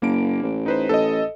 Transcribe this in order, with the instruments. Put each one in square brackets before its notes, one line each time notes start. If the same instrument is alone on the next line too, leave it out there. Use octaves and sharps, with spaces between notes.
[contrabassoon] F#1 [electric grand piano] A#3 D7
[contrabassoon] A1
[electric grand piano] D#4 B4 C5
[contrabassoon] A1 [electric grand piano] A4 D#5